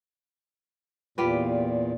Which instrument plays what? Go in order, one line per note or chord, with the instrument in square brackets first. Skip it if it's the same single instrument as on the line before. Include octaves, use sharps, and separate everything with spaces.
[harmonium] E2 A#2 [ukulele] F4 G4 B4